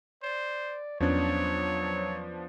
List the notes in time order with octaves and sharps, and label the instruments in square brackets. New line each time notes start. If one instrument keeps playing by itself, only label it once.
[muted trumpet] C5 [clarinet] D5
[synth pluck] E2 C#4 G#6 [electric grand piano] F3 B3 D4 [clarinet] F#3 [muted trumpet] C#5